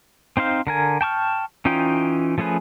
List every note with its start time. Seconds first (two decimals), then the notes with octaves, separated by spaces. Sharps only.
0.37 C4 D#4 C5 F5
0.67 D3 A#4 G#5
1.01 G5 A5 C#6 F6
1.65 E3 C#4 D#4 F4 G5
2.38 F3 A3 C#4 G#4 B4